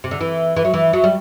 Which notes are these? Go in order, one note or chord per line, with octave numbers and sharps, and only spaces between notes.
C3
D3
E3
E3
F#3
E3
F#3
G3